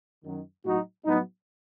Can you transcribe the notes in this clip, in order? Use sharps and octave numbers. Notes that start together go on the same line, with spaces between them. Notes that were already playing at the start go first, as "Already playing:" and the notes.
F#2 D#3 F#3
A2 F#3 D#4 F#4
A2 F#3 B3 D#4